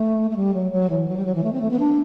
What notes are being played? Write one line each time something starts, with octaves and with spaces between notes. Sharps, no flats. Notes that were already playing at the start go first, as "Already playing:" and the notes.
Already playing: A3
A3
G3
F#3
F#3
E3
F#3
G3
F#3
E3
A3
C4
A3
B3
D4